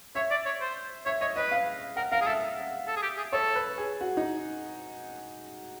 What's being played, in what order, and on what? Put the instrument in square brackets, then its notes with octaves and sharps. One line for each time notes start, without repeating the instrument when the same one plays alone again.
[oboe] C#5 [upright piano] E5
[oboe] D5
C#5
C5
[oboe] C#5 [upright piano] E5
[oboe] C#5 [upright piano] D#5
[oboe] B4 [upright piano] D#5
[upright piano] F5
[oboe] A#4 [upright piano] F#5
[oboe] A#4 [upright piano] F5
[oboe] G#4
[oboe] A4 [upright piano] E5
[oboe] A4
G#4
G4
G#4
[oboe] A4 [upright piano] C#5
[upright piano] B4
G#4
F#4
D#4